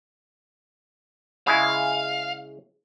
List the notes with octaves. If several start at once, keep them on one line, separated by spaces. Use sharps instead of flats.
C#3 G#3 E4 F5